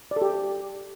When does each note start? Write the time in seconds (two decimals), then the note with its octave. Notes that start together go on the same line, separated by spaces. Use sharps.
0.11 D5
0.16 A4
0.22 G4